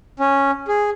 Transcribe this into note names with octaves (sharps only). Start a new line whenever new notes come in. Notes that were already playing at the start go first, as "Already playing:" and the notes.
C#4
G#4